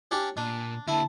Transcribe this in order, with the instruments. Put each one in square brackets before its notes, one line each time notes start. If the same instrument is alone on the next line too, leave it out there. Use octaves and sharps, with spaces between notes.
[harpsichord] C#4 D4 G4
[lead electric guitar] A#2 [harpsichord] D4
[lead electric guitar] D3 A#3 [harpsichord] E4 [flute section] A5